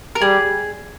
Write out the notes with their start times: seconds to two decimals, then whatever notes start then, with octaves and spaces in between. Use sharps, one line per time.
0.15 A#4
0.21 G3 G#4